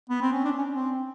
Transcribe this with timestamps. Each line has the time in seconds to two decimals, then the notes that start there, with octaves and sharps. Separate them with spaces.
0.10 B3
0.21 C4
0.32 C#4
0.45 D4
0.58 C#4
0.73 C4